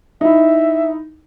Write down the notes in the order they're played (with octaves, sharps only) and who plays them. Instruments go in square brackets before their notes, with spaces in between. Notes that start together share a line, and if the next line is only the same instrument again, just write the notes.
[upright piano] D#4 E4 [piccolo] E5